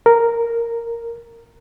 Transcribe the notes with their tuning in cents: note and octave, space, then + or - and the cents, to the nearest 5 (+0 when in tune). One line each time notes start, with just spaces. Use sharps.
A#4 -5